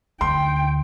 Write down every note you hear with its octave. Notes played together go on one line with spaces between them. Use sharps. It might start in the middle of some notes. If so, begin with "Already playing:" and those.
D2 G5 C6